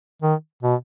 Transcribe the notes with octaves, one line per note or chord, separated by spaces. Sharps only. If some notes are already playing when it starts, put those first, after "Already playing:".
D#3
B2